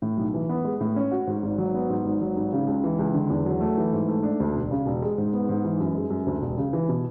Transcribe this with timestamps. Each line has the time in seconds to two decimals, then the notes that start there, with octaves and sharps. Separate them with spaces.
0.02 A2
0.18 B1
0.34 E3
0.49 B3
0.65 G#3
0.81 A2
0.96 C#4
1.11 F#4
1.27 G#2
1.43 G#1
1.58 F#3
1.74 B3
1.90 G#2
2.05 G#1
2.21 F#3
2.37 G#1
2.53 C#3
2.68 C#2
2.84 E3
2.99 C#2
3.14 D3
3.30 E2
3.46 F#3
3.61 A3
3.77 E3
3.93 G#2
4.08 A3
4.23 D4
4.40 D2
4.55 E1
4.71 C#3
4.86 E1
5.02 G#3
5.18 G#2
5.33 B3
5.49 G#2
5.64 E3
5.80 F#2
5.95 G#3
6.10 F#2
6.26 D2
6.42 E1
6.58 C#3
6.73 E3
6.89 B2